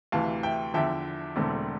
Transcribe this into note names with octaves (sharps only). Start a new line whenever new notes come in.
D2 C3 E3 F5 A5
E5 G5
E2 D3 F3 E5 G5
E1 E2 D3 A3 C4